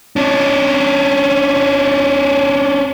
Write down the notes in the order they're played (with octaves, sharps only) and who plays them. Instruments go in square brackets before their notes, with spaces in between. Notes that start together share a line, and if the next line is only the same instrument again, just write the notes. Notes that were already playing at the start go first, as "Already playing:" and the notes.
[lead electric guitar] C#4 D4